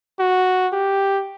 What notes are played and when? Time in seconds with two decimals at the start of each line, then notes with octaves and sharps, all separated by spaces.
0.20 F#4
0.73 G4